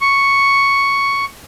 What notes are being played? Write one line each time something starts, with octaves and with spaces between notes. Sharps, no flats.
C#6